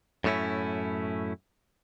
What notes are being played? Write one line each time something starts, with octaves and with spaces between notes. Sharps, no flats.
F#2 A2 A3 C#4 E4